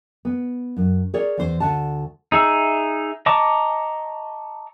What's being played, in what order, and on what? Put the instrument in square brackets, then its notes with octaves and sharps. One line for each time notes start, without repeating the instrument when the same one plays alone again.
[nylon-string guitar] B3
F#2
G#4 A#4 C#5 D5
E2 C5
D2 F#5 A5
[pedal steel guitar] D#4 G#4 E5
D#5 A5 A#5 C#6 D6